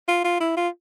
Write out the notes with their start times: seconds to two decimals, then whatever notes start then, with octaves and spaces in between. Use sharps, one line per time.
0.08 F4
0.24 F4
0.40 E4
0.57 F4